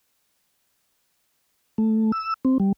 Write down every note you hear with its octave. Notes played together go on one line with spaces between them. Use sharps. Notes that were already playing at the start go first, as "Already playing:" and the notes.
A3
E6
C4
G3